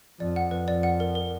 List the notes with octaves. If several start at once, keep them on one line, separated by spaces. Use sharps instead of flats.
F2 D5
F#5
B4
F2 D5
F#5
A#4
A#4